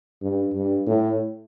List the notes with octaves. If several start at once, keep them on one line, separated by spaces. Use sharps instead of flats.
G2
G2
A2